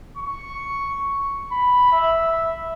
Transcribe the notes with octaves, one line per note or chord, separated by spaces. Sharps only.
C#6
B5
E5